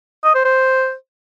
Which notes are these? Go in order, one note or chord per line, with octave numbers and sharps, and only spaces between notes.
D#5
C5
C5